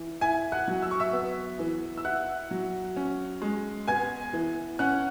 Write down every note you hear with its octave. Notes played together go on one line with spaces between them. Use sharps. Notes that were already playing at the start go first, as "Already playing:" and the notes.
Already playing: E3
E4 G#5 G#6
F#5 F#6
F#3
E6
C#6
E5 E6
B3
E3
E6
E4 F#5 F#6
F#3
C#4
G#3
B3 G#5 G#6
E3
C#4 F#5 F#6